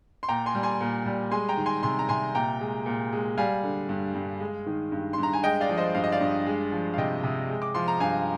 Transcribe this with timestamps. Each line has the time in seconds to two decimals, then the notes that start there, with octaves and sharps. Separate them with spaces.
0.23 C6
0.28 A#2 G5 A#5
0.46 G#5 C6
0.55 G3
0.63 G#5 C6
0.81 A#2
1.06 G3
1.31 G#3 G#5 C6
1.49 G5 A#5
1.57 D#3
1.66 G#5 C6
1.83 C3 G#5 C6
1.99 A#5
2.09 C3 G#5 C6
2.35 A#2 G5 A#5
2.61 G#3
2.86 A#2
3.12 G#3
3.38 G3 F5 G#5
3.63 D3
3.89 G2
4.14 G2
4.40 G#3
4.67 D#3
4.92 G2
5.13 G2 C6
5.23 A#5
5.33 G#5
5.43 G#3 D#5 G5
5.61 D5 F5
5.69 F3
5.77 C5 D#5
5.95 G2 F5
6.04 D#5
6.12 D5 F5
6.21 G2
6.46 G#3
6.72 F3
6.94 F5
6.97 C3 D#5 G5
7.24 C3
7.49 G#3
7.62 D6
7.75 F3 C6
7.88 A#5
8.00 G2 F5 G#5